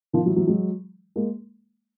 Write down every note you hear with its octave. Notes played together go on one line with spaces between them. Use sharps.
D#3 F3
E3 F#3
E3 F#3
F#3 G#3
G#3 A#3